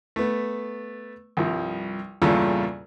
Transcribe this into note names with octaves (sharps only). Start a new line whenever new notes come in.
A3 B3
C2 G2 F3
E2 G2 A#2 C#3 F4 A4